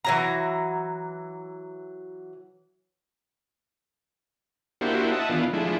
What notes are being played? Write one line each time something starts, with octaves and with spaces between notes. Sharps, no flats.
E3 F#3 A#5
A#3 D4 E4 F#4 G4 C5
D#5 E5 F#5 A5
D#3 E3 B3 D4 F4
F3 G#3 A3 D4 E4